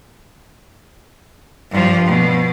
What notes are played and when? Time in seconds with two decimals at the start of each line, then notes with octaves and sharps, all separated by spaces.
1.71 G2 F3
2.06 B2